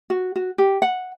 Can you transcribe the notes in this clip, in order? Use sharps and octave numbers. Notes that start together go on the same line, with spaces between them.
F#4
F#4
G4
F#5